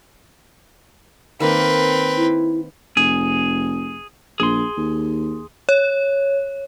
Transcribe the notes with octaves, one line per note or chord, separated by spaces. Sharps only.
D#3 A#3 C4 A#4 B4
E4
F1 G#4
A#1 G#4 C6
D#2
C#5